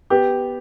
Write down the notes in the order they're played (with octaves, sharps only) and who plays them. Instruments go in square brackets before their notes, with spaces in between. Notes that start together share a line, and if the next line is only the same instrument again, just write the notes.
[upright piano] B3 G4